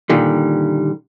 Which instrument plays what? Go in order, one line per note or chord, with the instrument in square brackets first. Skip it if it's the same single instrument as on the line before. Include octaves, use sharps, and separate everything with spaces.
[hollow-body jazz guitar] A#2 D3 D#3 G3